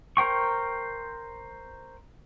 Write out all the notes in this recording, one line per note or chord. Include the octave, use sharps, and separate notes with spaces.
A#4 C5 G5 C#6